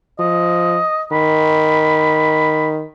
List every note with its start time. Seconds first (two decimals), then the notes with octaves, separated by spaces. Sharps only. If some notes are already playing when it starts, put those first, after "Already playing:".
0.20 F3 D#5
1.12 D#3 B5